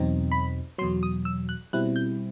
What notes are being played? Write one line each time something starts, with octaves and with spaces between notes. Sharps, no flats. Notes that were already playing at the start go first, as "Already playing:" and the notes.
Already playing: E2 B2 F#3 C4 D#4
B5
E2 B2 F#3 C6
D#6
E6
F#6
B2 G3 C4 E4 F#6
G6